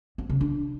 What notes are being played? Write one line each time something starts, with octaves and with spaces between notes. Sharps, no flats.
C4
C#3
D4